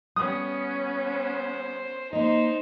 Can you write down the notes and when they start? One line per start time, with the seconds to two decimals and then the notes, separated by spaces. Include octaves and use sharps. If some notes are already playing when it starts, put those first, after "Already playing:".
0.16 G3 B3 C#4 D#6
1.07 C5
2.13 A#3 D#4 C5 D#5